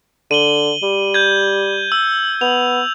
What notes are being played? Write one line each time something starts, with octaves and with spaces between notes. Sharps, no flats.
D3 D#7 F#7 G7
G3
G6 G#6
E6
B3 F7